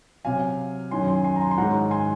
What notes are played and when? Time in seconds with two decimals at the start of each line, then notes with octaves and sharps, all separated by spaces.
0.25 C3 F#3 F5 G#5
0.91 F#2 D#3 F#3 G#5 C6
1.08 G#5 C6
1.24 G#5 C6
1.36 A#5
1.41 G#5 C6
1.51 C6
1.58 G#2 D#3 F#3 F#5 A#5
1.91 G#5 C6